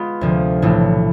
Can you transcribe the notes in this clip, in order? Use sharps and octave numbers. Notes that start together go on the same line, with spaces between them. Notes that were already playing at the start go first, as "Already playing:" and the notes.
Already playing: G#3 B3 F4
D2 C3 F3
B1 A2 E3 A3